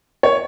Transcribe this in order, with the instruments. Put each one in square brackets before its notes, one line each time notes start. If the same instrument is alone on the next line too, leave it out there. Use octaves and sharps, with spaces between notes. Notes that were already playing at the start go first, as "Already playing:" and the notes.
[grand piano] C#5